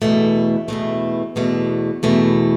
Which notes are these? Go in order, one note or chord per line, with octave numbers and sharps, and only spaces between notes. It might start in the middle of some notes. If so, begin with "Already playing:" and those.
E2 B2 A3
E2 B2 A3
E2 B2 A3
E2 B2 A3